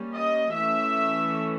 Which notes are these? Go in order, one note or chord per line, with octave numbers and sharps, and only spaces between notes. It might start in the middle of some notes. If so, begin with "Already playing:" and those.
Already playing: G3 A#3 C#4
D#5
E3 A3 C#4 E5